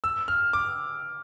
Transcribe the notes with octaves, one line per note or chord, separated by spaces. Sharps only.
E6
F6
D6